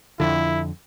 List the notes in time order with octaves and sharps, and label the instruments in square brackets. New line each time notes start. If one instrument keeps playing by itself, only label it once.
[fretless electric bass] F2 D3 [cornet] E4